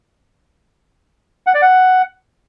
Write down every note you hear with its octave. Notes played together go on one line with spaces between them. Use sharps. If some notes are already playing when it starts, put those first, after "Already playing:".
F#5
D5
F#5